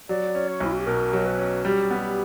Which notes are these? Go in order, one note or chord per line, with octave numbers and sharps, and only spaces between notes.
F#3 D5
C#4
C#5
B1 E4
F#4
G4
B2 A#4
F#3
B4
C#4
G3 G4
B3